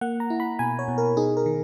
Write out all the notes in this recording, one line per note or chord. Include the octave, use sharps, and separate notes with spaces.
A#3 F#5
A#5
E4
B5
B2 G#5
C#5
B2
A#4
D#4 G#4
A#4
D#3